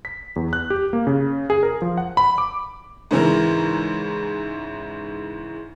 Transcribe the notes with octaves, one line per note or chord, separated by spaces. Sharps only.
B6
E2
F#6
G4
A#3
C#3
G#4
A#4
F3
F#5
B5
D6
G#2 C#3 E3 A#4